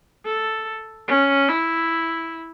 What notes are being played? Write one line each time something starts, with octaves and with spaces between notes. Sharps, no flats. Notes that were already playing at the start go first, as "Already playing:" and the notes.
A4
C#4
E4